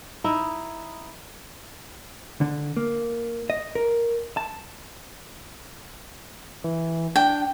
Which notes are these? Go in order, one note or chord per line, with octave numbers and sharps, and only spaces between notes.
D#4 E4 D#5
D3
A#3
D#5
A#4
A5
E3
D4 G5